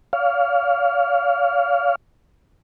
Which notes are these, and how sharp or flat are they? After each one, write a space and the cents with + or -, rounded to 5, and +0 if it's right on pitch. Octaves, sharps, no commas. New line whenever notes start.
C#5 +45 F5 +0